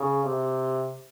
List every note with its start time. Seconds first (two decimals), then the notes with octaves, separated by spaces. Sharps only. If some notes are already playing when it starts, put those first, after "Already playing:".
Already playing: C#3
0.25 C3